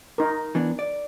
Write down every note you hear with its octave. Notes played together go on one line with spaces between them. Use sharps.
D#4 A#4
E3 B3 D4
D5